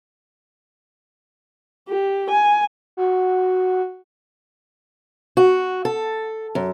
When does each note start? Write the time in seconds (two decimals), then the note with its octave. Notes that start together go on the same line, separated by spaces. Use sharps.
1.89 G4
2.31 G#5
2.97 F#4
5.37 F#4
5.85 A4
6.55 F#2